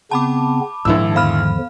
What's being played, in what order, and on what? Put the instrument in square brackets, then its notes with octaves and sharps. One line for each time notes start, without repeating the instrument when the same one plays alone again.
[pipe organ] C#3 B3 C4 [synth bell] A5 B5 D6
[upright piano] A#1 E4 E6 [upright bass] G#2 D#3 [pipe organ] D4
[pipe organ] E2 D3 F3 [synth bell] F5 B5 F6